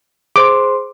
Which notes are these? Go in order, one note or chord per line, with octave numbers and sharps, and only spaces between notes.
G#4 C5 C6 D6